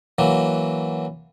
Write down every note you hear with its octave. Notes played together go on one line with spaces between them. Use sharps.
E3 F#3 A#3